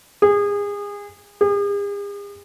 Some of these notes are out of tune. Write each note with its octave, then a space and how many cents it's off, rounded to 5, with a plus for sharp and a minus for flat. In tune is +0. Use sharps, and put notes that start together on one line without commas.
G#4 -30
G#4 -45